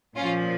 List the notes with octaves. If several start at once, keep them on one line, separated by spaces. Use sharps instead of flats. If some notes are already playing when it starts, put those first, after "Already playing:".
A#2 F3 C#4 F4